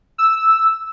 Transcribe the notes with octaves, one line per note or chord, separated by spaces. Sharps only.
E6